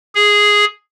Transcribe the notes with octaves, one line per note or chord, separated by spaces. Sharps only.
G#4